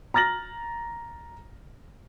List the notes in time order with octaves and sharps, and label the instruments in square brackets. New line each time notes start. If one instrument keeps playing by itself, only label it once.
[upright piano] A#5 F6 A6 A#6 F#7